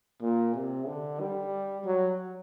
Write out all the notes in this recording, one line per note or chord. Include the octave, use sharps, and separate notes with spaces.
A#2
C3
D3
G3
F#3